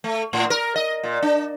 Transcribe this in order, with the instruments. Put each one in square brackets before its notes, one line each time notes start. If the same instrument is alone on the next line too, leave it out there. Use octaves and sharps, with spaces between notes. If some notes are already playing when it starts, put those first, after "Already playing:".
[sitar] A3
A2
A#4
D#5
A#2
D4